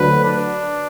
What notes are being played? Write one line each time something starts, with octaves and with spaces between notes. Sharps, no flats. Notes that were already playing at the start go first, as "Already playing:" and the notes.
Already playing: D2 D3 F#3 B4
D4